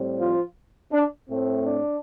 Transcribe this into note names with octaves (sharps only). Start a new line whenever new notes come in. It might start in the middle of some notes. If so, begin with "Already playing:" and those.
Already playing: A2 G3 C4
F3 F4
D4
A2 A3 C4
D4